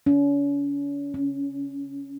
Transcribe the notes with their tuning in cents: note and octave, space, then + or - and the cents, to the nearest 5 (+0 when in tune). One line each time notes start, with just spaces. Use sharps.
C#4 +40
C#4 +5